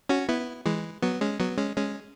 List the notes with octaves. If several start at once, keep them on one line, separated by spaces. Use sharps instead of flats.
C#4 F#4
B3 E4
E3 G#3
F#3 B3
G#3 C#4
F#3 B3
G#3 C#4
G#3 C#4